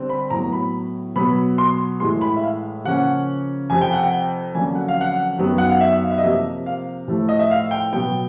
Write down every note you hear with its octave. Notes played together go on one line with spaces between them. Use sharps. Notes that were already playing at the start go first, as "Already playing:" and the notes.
Already playing: D3 G3 C4
B5
A2 F#3 B3 A#5
B5
B2 F#3 B3 B5
C6
A2 E3 G#3 C6
B5
E5
F5
C#3 F3 A#3 C#4 F#5
F2 C3 F3 G#5
G5
F#5
G5
F2 D3 F#3 A#3 C#4 G#5
F#5
F5
F#5
F#2 D#3 F#3 B3
F#5
F5
E5
F5
E5
D#5
C3 F3 A#3 E5
F5
A2 F3 A3
D#5
E5
F5
G5
B2 F#3 B3 G5